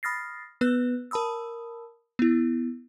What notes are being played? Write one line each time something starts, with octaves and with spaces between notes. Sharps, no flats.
B5 D#6 F6 A6 A#6 C7
B3 B4 F#6
A#4 A5 B5 D#6 E6
B3 E4